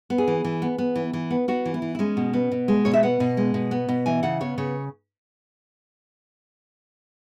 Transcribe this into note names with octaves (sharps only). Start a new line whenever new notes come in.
B3
G#4
E3
E3
B3
B3
E3
E3
B3
B3 F#4
E3
E4
E3
E4
G#3 C#4
B2
B3
B2
G#3
B2 C#5
E5
B3 F#5
B2
G#3
B2
B3
B2
E3 G#5
C#3 F#5
B3 C#5
C#3 C#5